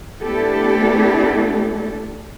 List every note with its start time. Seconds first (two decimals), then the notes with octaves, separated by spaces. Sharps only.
0.22 A3 B3 D4 E4 G4 A4